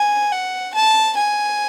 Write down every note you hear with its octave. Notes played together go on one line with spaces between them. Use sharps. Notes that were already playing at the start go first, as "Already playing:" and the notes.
Already playing: G#5
F#5
A5
G#5